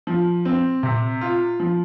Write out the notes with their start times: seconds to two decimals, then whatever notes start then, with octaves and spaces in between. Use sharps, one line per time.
0.07 F3
0.45 C4
0.83 C3
1.21 F4
1.60 F3